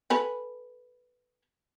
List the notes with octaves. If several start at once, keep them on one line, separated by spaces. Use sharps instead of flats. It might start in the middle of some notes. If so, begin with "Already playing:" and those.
A4 B4 G#5